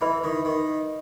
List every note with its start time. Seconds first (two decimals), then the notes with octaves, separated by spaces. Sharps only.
0.01 E3 B4 E5 B5
0.24 D#3
0.45 D#3